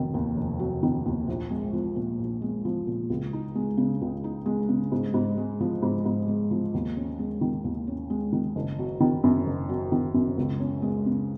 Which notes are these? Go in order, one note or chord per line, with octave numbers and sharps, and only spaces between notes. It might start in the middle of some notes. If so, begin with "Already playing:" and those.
Already playing: F1 D#3 F#3
D#2
F1
F#3
D#3
D#2
A#1
G#3
F3
A#2
A#1
G#3
F3
A#2
C#2
D#4
G#3
C#3
C#2
D#4
G#3
C#3
G#2
G#2
G#3
F3
G#2
G#2
G#3
F3
D#2
C#4
G#3
D#3
D#2
C#4
G#3
D#3
F#1
F#3
D#3
F#2
F#1
F#3
D#3
F#2
C#2
C#4
G#3
C#3